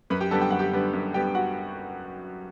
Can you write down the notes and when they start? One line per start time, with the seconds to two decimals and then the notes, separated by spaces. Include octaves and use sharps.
0.10 F#2 B4 B5
0.20 G4 G5
0.31 D3 G3 B3 A4 A5
0.41 G5
0.50 F#2 F#5
0.59 G4 G5
0.73 D3 G3 B3
0.93 F#2
1.14 D3 G3 B3 G4 G5
1.35 F#4 F#5